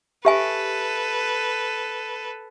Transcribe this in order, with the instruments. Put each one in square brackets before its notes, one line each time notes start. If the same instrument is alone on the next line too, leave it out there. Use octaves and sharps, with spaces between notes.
[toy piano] G4 E5 G#5 [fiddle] A4 B4